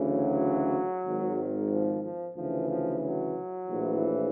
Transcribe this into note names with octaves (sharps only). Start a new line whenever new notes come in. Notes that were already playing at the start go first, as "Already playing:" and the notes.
Already playing: D2 C#3 E3
F#3
G#1 G#2 D#3
F3
F3
D2 C#3 E3 F3
F3
F#3
A#1 A2 E3